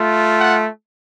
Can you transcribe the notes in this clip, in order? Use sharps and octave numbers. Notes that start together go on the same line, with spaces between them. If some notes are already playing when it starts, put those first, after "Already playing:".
Already playing: A3 F4
F#5